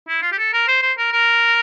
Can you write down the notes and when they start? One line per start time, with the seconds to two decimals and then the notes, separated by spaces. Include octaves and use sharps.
0.08 E4
0.22 F4
0.32 G4
0.38 A4
0.53 A#4
0.68 C5
0.82 C5
0.98 A#4
1.12 A#4